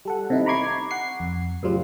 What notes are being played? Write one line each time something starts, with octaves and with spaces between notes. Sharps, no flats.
G3 A4 F#5
C3 D#3 D#4 E4
A#5 B5 C#6 D6 G#6 C7
F#5 C7
F2
F#2 A2 C#3 F3 G3 F4